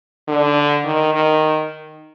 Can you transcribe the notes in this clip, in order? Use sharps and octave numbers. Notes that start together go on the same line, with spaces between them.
D3
D#3
D#3